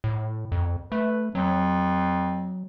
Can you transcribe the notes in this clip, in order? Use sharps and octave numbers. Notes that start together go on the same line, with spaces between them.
A2
F2
A3 B4
F2 F#3